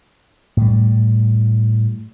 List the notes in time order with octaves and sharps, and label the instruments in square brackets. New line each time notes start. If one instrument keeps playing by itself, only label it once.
[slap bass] A2 G3